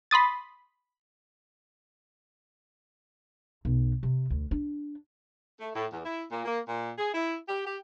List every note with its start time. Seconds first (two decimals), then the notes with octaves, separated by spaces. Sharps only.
0.11 B5 C6 D#6 A6
3.65 B1
4.03 C3
4.30 D2
4.51 D4
5.61 A3
5.74 A2
5.92 E2
6.05 E4
6.31 A#2
6.45 A#3
6.68 A#2
6.98 G#4
7.14 E4
7.49 G4
7.67 G4